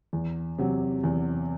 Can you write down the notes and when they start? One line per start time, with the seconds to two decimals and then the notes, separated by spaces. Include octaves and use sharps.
0.13 E2
0.58 C3 F#3
1.04 E2